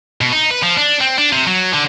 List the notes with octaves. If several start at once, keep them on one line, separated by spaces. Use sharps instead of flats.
B2
D#4
B4
F3
D4
C4
D4
C3
F#3
D3